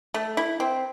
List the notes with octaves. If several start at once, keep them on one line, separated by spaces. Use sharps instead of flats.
A3
E4
C4